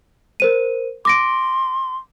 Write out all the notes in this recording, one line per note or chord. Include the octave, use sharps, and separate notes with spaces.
A#4 C5 D#7
C6 D6 A#6 D7